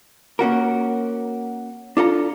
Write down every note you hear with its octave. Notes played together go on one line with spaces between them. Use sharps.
A#3 C#4 F#4 A#4
D4 F4 A4 A#5